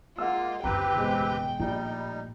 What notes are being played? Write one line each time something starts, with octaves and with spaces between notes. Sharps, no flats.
G#3 A#3 F4 F#5 E6
F#1 D2 C4 G4 B4 G5 A#5
E1 G#3
A#1 A2 G3 D#4